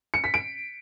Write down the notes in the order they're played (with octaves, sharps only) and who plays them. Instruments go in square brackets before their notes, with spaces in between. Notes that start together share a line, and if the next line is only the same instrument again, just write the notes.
[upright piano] C#7
B6
D7